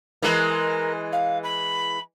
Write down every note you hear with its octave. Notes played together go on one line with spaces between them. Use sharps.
E3 G#3 A#4
F5
B5